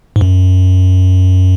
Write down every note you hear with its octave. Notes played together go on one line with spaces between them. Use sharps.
G#2
F#2